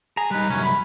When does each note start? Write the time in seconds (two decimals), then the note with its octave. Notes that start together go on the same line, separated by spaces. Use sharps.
0.17 G#4 A#5
0.31 G3 D#4 B4
0.49 C2 F#2 C#4
0.63 B5